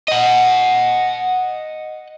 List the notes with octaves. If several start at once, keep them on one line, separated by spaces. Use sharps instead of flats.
D#5 F#5